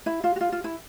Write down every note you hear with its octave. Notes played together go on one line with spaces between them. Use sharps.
E4
F4
F#4
F4
F4
E4